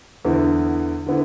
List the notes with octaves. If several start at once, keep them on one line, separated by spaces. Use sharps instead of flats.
E2 D3 B3 E4
D3 B3 E4